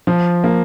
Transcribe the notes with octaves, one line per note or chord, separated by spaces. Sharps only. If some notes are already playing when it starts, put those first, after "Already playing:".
F3
A#3